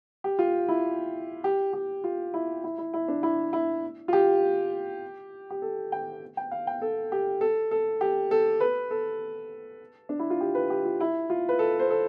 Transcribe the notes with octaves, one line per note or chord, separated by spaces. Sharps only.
G4
F4
E4
G4
G4
F4
E4
E4
E4
E4
D4
E4
E4
F4
G4
G4
A4
G5
G5
F5
G5
A4
G4
A4
A4
G4
A4
B4
A4
D4
E4
F4
G4
B4
G4
F4
E4
F4
B4
A4
C5
A4